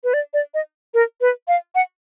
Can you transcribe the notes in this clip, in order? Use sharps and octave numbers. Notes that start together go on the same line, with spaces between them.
B4
D5
D5
D#5
A#4
B4
F5
F#5